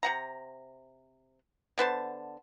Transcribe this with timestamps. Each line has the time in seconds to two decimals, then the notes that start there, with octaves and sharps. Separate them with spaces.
0.03 C3 F#5 A#5
1.78 D3 B3 C5 A5